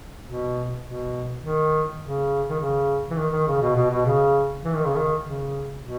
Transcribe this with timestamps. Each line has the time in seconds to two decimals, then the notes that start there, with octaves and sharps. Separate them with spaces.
0.25 B2
0.84 B2
1.42 D#3
2.01 C#3
2.49 D#3
2.60 C#3
3.10 E3
3.17 D#3
3.32 D#3
3.47 C#3
3.62 B2
3.76 B2
3.91 B2
4.06 C#3
4.64 E3
4.75 D#3
4.85 C#3
4.95 D#3
5.22 C#3
5.81 B2